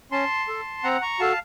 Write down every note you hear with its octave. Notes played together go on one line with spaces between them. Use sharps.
C#4 A5 C6
A4
C4 F#5 A#5
A#5 C#6
F#4 A4 F5 A5